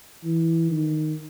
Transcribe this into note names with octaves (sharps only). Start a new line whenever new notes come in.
E3
D#3